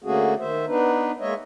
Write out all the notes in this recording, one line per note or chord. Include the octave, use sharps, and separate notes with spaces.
D3 A3 A#3 C#4 F#4 G#4
D#3 C5 E5
B3 D4 D#4 B4
G#3 A#3 C#5 D#5 E5